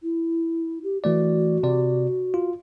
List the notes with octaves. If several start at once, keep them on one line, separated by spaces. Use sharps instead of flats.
E4
G4
E3 A3 F#4 D5
C3 D5
F4